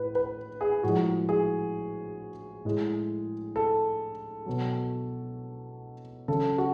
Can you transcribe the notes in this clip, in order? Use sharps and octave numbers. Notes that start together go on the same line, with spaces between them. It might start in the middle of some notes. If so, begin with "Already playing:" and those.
Already playing: A2 B4
B4
G#4
A2 F3 G#3 F#4
G#4
A2 G#3
A4
B2 F#3
C#3 F#3 A4
F#4